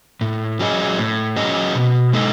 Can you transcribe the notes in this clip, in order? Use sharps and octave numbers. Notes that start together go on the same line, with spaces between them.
A2
F#3 C#4 G#4 D#5
A2
F#3 C#4 G#4 D#5
B2
G#3 D#4 A4 D#5